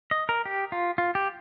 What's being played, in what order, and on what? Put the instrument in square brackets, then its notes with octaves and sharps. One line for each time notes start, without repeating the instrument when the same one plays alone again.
[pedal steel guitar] D#5
A#4
G4
F4
F4
G4